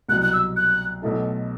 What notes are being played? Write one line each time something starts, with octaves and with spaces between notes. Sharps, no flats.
C2 B2 F#3 F#6
F#6
E6
F#6
B1 B2 A3 E4 A4